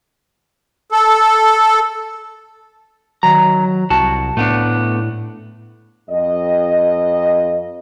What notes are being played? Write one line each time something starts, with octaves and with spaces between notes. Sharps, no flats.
A4
D#3 F#3 A#5
C2 F#4 A5
A2 A3 B3 D4
F2 D#5